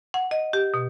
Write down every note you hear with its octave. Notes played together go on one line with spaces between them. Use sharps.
F#5
D#5
G4
B2